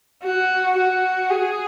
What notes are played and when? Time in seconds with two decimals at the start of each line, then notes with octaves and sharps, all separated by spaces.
0.24 F#4
0.77 F#4
1.30 G#4